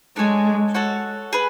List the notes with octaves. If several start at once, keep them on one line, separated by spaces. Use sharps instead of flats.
G#3 D4 A4 C#5 G#5
F#4 A4 C#5 F#5
G#4 B4